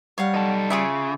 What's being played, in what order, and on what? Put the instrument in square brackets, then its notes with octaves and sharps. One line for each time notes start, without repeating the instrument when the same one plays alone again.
[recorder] G3 [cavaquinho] C#5 F5 F#5
[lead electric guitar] D#4 A4
[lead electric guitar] C#3 [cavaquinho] F4 G#4 E5